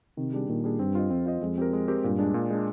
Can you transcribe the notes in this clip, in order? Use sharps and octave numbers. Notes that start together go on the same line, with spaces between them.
C3 D#3
G3 D4 G#4
A#2 D#3
G3 D4 G#4
G2 C4
F4 C5 D#5
F2 C4
F4 C5 D#5
F2 G#3
C4 G4 A#4
G#3
C4 G4 A#4
G2 A#2
G#3 D4
A#2
G#3 D4